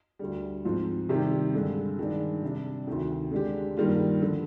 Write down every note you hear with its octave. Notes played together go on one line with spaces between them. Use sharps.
D2 D3 G3
G#2 F3 C4 F4
C3 D#3 G3 C4 G4
G2 D3 G#3
G2 D#3 G#3 D4
C3 G3 D4
D2 C3 D#3
D3 G#3 D4 G4
G2 D#3 G3 A#3 F4
D3 F3